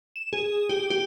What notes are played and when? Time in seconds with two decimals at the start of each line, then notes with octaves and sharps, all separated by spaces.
0.16 E7
0.33 G#4
0.69 G4
0.90 G4